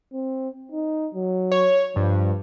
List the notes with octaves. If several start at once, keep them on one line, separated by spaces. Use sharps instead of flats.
C4
D#4
F#3
C#5
G2 F3